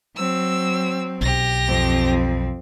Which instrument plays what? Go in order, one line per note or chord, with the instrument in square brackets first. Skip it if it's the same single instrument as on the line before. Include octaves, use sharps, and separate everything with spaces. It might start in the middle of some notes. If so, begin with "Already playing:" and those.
[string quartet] F#3 C4 [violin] E6
[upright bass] B1 [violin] G4 A#6
[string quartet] F2 C4